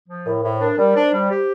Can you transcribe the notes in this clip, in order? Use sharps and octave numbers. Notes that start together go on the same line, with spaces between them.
F3
A2 A#4
A2 C5
D4 A#4
G3 A#4
D4 C5
G3
G4